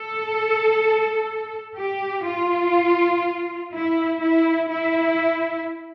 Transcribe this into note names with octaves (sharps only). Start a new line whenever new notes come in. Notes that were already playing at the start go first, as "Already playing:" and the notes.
Already playing: A4
G4
F4
E4
E4
E4